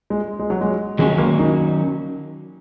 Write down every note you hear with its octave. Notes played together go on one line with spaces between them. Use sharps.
G#3
G#3
F#3
G#3
D#3 F#3 G#3 C#4 F#4
A#3
D#4